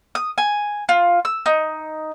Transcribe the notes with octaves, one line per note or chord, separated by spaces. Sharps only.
D#6
G#5
F4
E6
D#4